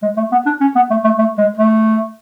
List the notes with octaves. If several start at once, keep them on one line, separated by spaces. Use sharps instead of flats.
G#3
A3
B3
D4
C#4
B3
A3
A3
A3
G#3
A3